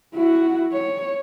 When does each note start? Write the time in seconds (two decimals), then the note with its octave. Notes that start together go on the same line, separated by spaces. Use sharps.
0.14 E4 F#4
0.73 C#5